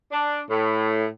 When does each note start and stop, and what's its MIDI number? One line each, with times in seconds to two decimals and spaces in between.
0.12 0.41 62
0.50 1.06 45